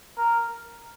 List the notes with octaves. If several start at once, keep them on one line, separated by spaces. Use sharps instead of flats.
A#4